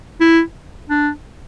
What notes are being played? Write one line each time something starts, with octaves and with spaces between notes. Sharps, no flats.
E4
D4